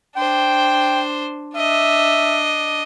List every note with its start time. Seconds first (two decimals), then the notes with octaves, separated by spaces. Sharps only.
0.16 D4 C5 G5
1.56 D4 D#5 E5